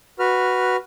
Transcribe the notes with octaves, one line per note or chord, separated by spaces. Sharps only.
F#4 B4 F6